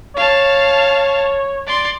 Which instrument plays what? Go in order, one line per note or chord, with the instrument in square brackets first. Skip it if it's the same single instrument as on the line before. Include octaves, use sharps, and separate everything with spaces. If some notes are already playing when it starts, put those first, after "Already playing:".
[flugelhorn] C#5 [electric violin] F5 A5
[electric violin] D5 C6